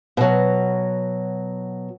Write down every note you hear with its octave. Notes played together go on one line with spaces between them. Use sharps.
B2 F#3